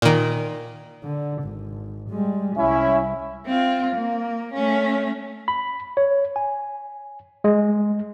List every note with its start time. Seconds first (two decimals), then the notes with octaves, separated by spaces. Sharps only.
0.02 A#2 D#3
1.04 D3
1.43 G#1
2.10 G3 G#3
2.57 C2 C#4 E4 E5
3.46 C4 F4
3.95 A#3
4.54 A3 C#4
5.48 B5
5.97 C#5
6.36 G#5
7.44 G#3